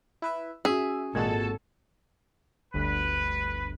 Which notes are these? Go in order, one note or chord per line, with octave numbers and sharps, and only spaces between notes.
E4 B4 E5
C#4 F#4 G#4 E5
G#1 A#2 G#3 F#4 A4 G#6
G1 D2 B4